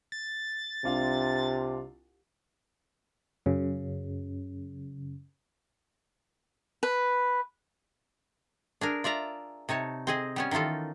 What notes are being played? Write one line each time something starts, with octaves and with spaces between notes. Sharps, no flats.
A6
C2 C3 D4 F4
F#2 C#3
B4
D4 G#4 A#4
F4 D5 E5 A#5
C3 D#4 C#5 A5
C4 G#4 D#5
G3 B3 C#4
D#3 E3 D#4 F4 A4